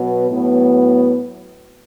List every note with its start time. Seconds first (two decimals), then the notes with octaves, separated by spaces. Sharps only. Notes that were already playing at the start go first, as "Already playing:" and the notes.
Already playing: B2 F#3 B3
0.30 A2 F#3 B3